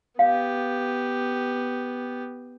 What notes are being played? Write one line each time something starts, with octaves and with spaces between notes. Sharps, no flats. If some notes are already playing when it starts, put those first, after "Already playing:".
B3 G4 F5